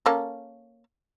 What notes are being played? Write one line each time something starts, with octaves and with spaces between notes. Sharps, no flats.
A#3 C#4 A4